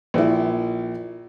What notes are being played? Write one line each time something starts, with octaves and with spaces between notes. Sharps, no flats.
A#1 E4